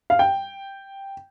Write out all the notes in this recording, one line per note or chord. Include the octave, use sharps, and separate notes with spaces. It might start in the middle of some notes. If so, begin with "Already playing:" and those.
F5
G5